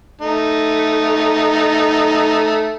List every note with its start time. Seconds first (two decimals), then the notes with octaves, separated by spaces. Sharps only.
0.21 A3 D#4